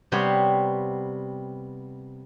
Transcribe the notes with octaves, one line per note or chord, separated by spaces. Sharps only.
C3 G3 B3 C5 C#5